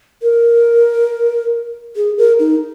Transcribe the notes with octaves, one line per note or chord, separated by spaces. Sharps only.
A#4
G#4
A#4
D#4